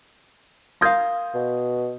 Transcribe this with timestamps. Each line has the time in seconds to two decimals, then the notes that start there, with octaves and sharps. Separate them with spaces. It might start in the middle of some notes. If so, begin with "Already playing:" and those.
0.81 A#4 F5 C6 D#6 G6
1.35 B2